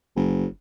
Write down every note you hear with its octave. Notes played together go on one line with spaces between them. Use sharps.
F#1